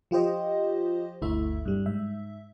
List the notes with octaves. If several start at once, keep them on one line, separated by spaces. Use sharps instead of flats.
F3 F4 G4 C5 D#5
G1 D2 A3 E4 E5
G2 G3
G#2 E5